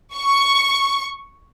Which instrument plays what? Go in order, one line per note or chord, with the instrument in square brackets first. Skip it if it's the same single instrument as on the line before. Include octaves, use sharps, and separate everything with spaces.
[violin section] C#6